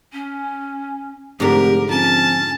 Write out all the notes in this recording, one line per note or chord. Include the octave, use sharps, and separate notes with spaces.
C#4
F1 G#2 D3 G4 A#4
F2 C#4 A5